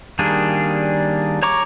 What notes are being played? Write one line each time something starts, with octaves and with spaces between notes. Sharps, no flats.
D#3 G3 A#3 D4 G#4
C#5 A#5 C#6 D6